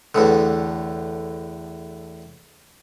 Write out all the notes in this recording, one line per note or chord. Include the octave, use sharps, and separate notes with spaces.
E2 A2 D3